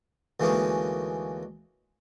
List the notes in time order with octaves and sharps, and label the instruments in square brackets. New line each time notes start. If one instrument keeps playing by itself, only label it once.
[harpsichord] D2 E3 G#3 A#3 C#4 D#4